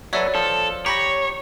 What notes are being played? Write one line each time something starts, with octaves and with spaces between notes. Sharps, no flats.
F#3 A4 B4 C#5 D5 E5
F3 A4
G4 C#5 A#5 B5 A#6